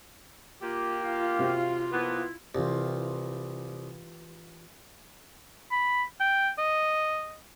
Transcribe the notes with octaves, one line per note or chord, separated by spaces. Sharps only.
A#3 F4 G4
F4 F5
C3 C4 F#4
F3 A#3 B3 E4
C2 E3 F4 G4
B5
G5
D#5